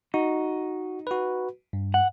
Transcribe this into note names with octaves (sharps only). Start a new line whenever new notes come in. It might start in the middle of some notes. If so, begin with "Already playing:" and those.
D#4 F#4
F#4 B4
G2
F#5